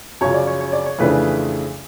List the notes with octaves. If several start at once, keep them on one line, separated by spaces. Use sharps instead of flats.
F#2 C#3 F3 C#5
D5
C#5
C#5
D5
C#5
F2 C#3 E3 A3 D4 B4